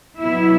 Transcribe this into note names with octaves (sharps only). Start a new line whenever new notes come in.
B2 F#3 B3 E4 E5